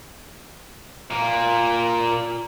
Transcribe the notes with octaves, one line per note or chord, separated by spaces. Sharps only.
A#2 A#3